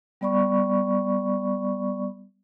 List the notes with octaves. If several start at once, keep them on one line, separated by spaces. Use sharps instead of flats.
G3 B3 D5 B5 C#6